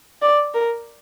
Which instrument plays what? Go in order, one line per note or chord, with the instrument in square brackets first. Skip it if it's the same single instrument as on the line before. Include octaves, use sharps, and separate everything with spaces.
[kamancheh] D5
A#4